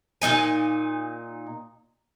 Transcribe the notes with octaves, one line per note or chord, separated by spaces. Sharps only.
A#2 A#3 D#4 G#5